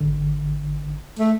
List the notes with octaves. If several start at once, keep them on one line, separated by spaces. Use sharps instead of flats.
G#1 D3
A3